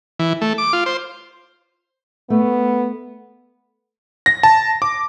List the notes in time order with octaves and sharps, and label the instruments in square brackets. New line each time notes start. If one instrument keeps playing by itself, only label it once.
[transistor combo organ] E3
A3
D6
F4
C5
[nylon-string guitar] A3 [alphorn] B3
[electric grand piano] A#6
A5
D6